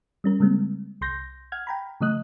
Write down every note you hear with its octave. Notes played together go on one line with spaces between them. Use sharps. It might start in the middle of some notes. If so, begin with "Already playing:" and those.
G3 C#4 A#4
C#3 G3 G#3 A#3 C4
C2 C6 G6 A#6
F#5 F6 G#6
G5 A#5 B5
C#3 F3 A3 D#5 D#6 F#6